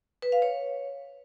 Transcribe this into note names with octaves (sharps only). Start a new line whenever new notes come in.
B4
F5
C#5